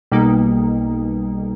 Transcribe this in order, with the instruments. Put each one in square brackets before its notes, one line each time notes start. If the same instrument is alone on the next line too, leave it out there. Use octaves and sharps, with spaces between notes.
[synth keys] B1 B2 G3 A#3 D#4